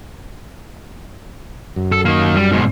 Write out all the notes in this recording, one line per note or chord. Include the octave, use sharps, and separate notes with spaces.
F#2
A4
D#3 A#3
G3
G#2 B2